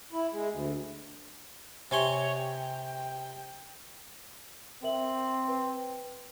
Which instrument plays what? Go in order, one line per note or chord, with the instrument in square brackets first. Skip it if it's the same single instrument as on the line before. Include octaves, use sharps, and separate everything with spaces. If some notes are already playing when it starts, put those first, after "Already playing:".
[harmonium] E4
G#3
D2
[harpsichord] C3 G#5 C6 [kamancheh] G4 C#5
[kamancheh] G5
[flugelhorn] C4 [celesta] A#4 E5 F#7
[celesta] B4 G5